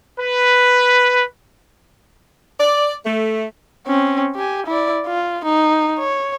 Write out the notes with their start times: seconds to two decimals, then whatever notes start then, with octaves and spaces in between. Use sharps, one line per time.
0.19 B4
2.60 D5
3.06 A3
3.87 C4 C#4
4.35 G4 G#5
4.67 E4 D5
5.07 F4
5.45 D#4
5.99 C#5